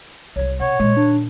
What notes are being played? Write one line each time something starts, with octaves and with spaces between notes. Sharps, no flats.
C2 G3 C#5
C3 C#5 F#5
A#2 D#3 G#3
D4